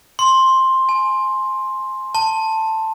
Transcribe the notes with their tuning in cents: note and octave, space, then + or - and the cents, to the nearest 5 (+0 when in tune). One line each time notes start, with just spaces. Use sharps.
C6 +10
G#5 +25
A5 +10